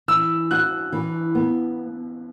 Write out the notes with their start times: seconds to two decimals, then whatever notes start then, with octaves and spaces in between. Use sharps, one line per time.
0.08 E3 E6
0.51 F#4 F#6
0.92 E3
1.35 B3